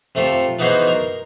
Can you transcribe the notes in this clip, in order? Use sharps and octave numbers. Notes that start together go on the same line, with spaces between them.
C3 A3 F4 A4
E3 B3 D#4 F#4 G#4 C5
A#4